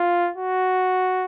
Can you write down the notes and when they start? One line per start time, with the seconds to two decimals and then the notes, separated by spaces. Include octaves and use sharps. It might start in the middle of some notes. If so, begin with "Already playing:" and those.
Already playing: F4
0.37 F#4